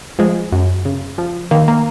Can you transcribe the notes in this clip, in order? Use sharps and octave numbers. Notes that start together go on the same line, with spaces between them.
F3 G#3
F#2
C#3
F3
D#3 A#3
A#3